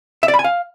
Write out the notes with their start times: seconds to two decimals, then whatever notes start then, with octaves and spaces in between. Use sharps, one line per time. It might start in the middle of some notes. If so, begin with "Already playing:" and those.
0.23 E5
0.28 D5
0.34 B5
0.39 G#5
0.44 F5